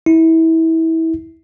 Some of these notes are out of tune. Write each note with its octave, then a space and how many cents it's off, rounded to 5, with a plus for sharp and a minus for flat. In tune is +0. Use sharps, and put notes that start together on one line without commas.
E4 -25